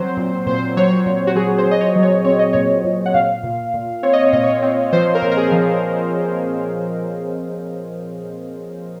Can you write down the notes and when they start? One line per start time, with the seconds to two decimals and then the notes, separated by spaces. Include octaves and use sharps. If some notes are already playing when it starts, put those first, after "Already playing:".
Already playing: F#3 C4 C5
0.17 A#2
0.46 A#2 C5
0.77 F#3 C#5
1.06 A#2
1.27 F#4
1.35 F#3 G#4
1.58 C5
1.66 F#3
1.71 D#5
1.81 C#5
1.95 F#3
2.03 C#5
2.25 C4 C#5
2.39 D#5
2.53 A#2 C#5
2.84 A#2
3.06 F#5
3.14 A#2 F5
3.44 A#2
3.74 A#2
4.03 C4 C#5
4.13 D#5
4.23 C#5
4.33 A#2 D#5
4.43 C#5
4.62 C4
4.92 F3 C5
5.15 A#4
5.22 A#2
5.31 A#4
5.37 G#4
5.52 F3